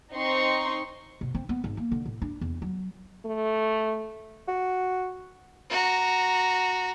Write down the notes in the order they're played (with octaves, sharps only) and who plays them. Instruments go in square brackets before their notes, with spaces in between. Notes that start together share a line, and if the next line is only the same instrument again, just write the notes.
[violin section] C4 D#4 C6 C#6
[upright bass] B2
C4
B3
G#1
A#3
D3
A2
D4
E2
F#3
[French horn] A3
[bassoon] F#4
[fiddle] F#4 A#5